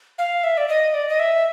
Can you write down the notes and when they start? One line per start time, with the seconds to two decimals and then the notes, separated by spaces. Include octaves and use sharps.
0.18 F5
0.44 E5
0.57 D5
0.69 D#5
0.94 D5
1.09 D#5
1.20 E5